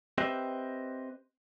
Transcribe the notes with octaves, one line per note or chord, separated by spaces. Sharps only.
C4 G4 B4 D#5 E5